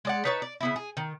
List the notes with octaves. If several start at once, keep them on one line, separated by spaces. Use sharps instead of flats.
G#3 D5 F#5
D#4 B4 C#5 A5
D5
C#3 B3 E4
G#4
D#3